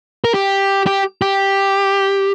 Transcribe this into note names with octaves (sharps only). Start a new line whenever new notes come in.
A#4
G4
G4
G4